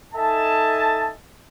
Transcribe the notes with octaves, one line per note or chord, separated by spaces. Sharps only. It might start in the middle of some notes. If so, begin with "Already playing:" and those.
D#4 A4 D#5 E5 G#5 A5